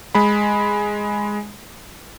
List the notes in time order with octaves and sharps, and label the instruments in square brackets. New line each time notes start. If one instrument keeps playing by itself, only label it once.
[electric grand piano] G#3 B5